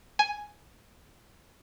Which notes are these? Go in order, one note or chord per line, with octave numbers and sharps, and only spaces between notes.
G#5